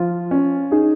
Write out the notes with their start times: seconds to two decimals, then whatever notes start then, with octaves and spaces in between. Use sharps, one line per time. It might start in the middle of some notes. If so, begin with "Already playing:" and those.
Already playing: F3 F4
0.31 C#4
0.71 D#4 G#4